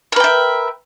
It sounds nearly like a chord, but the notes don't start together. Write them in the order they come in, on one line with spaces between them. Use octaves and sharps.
A#4 B4 G5 E5